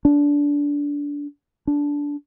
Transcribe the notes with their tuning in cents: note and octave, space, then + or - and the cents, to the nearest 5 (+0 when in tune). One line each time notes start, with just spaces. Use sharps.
D4 -20
D4 -15